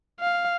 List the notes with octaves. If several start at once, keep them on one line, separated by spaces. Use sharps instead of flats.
F5